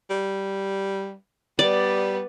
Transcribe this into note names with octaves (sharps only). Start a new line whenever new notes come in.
G3
G3 B3 B4 D5